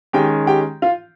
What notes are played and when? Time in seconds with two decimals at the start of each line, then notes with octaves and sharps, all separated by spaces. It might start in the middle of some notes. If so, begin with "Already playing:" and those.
0.13 D#3 G#3 C#4 G4 G5
0.47 G4 G5
0.82 F4 F5